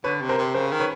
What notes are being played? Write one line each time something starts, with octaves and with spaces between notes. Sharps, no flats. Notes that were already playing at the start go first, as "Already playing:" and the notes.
D3 B4 C#5
C3
A#4 C5
C3
C#3 A#4 C5
D#3
B4 C#5